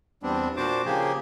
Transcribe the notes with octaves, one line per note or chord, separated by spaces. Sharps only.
E2 G3 B3 C4 D4
A#2 D4 F#4 C5 A5 D6
C#3 F3 A#3 G4 G#4